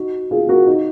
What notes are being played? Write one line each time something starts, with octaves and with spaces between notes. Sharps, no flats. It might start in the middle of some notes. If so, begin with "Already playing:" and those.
Already playing: D#4 F#4
F4 G#4
F#4 A#4
D#4